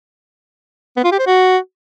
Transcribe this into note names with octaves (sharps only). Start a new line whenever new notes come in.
B3
F4
G4
C5
F#4